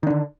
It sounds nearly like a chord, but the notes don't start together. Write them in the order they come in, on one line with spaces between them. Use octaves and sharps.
D#3 D4 D3